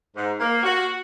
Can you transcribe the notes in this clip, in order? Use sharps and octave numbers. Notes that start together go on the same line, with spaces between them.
G#2
A#3
F#4